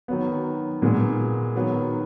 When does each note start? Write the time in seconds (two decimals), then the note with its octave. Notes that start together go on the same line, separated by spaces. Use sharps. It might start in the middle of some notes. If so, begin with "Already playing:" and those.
0.08 D#3 F#3 B3
0.82 A#2 G#3 B3
1.55 D#3 F#3 B3